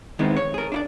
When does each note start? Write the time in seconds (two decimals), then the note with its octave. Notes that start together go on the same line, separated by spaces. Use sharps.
0.19 D#3 G#3 B3 C4 E4
0.37 C#5
0.54 G#4 A#4
0.72 D4 E4 D5